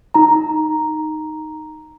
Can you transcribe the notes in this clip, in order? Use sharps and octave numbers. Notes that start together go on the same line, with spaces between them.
D#4 A#5